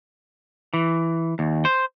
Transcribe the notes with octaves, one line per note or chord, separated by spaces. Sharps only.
E3
D#2
C5